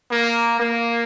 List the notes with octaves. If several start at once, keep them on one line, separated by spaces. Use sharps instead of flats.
A#3
A#3